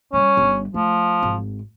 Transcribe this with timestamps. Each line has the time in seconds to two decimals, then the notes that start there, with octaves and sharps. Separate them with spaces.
0.13 G3 A#3 C#4
0.37 G1
0.74 F3 A3
1.23 G#1